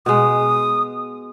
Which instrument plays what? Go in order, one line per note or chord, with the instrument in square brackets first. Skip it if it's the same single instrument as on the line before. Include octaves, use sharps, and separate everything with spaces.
[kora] B2 G#3 [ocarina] D#6